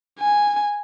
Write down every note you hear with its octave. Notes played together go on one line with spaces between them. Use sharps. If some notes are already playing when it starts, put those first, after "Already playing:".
G#5